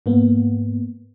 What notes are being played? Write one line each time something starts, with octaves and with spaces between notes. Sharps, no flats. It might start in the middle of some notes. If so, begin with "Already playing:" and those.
G#2 A#3 B3